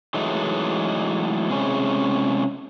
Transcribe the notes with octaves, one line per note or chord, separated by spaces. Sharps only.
E3 F#3 G#3 A3 D#4
C3 G#3 C#4